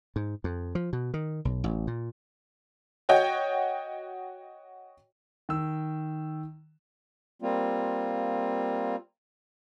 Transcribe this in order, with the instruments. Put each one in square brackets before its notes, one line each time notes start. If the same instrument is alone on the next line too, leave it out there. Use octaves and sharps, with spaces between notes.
[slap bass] G#2
F2
F3
B2
D#3
B1
A1
A#2
[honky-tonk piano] F#4 C#5 D#5 G5
[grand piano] D#3 E6
[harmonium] G3 A#3 C4 F4